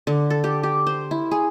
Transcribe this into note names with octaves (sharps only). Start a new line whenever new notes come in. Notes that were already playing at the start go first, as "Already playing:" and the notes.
D3
A4
G4
G4
C5
E4
G#4